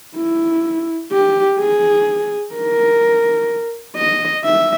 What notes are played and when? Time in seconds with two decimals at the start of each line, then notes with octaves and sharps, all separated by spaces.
0.17 E4
1.12 G4
1.60 G#4
2.54 A#4
3.97 D#5
4.44 E5